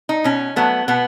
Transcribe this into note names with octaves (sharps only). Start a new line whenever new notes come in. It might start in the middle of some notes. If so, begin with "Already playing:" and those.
D#4
B2 C#4
F#3 A3 B3
B2 B3